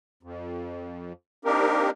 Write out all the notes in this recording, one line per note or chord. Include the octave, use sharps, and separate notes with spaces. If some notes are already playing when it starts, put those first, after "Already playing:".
F2
A#3 C4 D4 D#4 G4 A#4